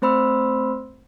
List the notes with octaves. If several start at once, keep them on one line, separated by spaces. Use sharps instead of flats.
A3 C4 C5 B5 C6 E6